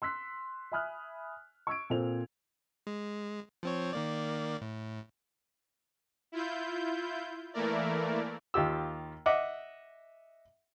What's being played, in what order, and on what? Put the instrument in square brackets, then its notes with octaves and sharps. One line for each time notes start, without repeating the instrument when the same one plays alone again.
[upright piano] C6 E6 F#6 B6
E5 G#5 B5 D#6 F6 F#6
C#6 E6 G#6 D7
A#2 C4 A4 C5 F7
[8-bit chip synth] G#3
F3 C4 C#5
D#3 A#3 D5
A2
[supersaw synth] E4 F4 G6
E3 A3 A#3 E4 A#4 D5
[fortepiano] D#2 F4 G4 E6
D#5 E5 F#5 D6